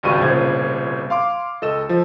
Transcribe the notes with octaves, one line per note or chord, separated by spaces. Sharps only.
G#1 C#2 G2 C#3 F#4 D#7
G1 C2 A#2 C#3 C5 G#6
F5 C6 D6
C#2 A4 D#5 E6 E7
F3